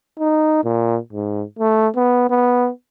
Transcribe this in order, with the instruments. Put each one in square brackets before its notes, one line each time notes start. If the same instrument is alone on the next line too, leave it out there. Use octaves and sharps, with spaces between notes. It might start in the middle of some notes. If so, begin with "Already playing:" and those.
[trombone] D#4
A#2
G#2
A3
B3
B3